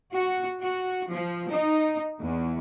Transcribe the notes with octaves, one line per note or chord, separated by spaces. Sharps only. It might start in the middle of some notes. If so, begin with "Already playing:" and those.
F#4
F#4
F3
D#4
E2